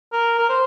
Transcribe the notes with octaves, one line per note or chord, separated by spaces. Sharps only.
A#4
A#4
C5